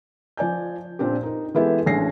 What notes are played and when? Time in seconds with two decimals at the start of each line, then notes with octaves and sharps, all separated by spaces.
0.37 F3 D5 G#5 G6
0.99 A#2 C4 D4 G4
1.23 D#4 A#4
1.54 E3 G#3 B3 E4 G4 A4
1.86 A1 G#3 D4 G#5 A#6 C7